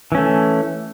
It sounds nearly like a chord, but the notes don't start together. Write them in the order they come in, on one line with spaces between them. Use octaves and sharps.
E3 C#4 A3